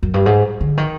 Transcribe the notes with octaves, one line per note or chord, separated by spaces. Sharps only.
F#2
G2
G#2
D3
D#3